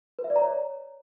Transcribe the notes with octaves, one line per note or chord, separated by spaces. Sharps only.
B4
E5
D5
A#5
C#5